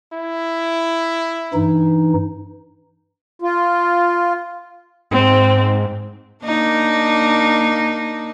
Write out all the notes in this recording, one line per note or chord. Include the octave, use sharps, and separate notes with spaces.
E4
G2 E3 D#4
F4
G#2 C4
A#3 D4 D#4